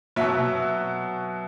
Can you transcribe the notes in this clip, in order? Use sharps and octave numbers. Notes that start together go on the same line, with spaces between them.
B2 F#3 E5